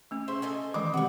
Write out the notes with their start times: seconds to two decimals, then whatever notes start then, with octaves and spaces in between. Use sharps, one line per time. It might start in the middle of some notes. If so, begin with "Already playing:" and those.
0.11 A3 C#4
0.28 C#3 C5 E5
0.42 A4 D#5 G#5
0.74 D#3 E3 G#3 C4 D6
0.94 C3 G3 B3 F#4